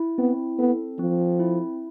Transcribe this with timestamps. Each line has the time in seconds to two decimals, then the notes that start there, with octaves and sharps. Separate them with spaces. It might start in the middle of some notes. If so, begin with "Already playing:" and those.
Already playing: E4
0.18 B3 C4
0.59 B3 A4
0.99 F3 C4
1.39 E4